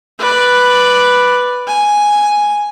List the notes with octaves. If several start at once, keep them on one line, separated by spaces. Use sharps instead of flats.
B4 D5
G#5